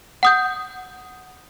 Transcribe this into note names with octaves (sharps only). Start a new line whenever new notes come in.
F#5 D#6 G6